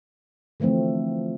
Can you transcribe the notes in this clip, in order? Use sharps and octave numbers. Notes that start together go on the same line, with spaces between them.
D3 E3 F3 A3 C4